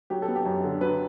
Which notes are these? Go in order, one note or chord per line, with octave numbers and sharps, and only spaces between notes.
F#3 G4
A4
B3
G4
F#2
D3
F#3 B4